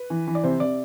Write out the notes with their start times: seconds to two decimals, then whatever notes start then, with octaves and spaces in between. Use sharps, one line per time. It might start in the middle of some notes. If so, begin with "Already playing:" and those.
Already playing: B4
0.10 E3
0.27 E3
0.35 D5
0.44 C3 C5
0.60 C3 D5